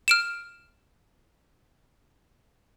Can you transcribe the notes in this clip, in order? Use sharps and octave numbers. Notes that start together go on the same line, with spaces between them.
F6 D7 E7